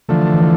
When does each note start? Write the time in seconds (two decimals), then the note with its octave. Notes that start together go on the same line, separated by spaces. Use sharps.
0.09 D3 E3 F3 A3
0.34 E3